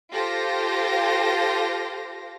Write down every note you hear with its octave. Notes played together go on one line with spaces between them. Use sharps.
F4 G4 A4 C5 F5 A#6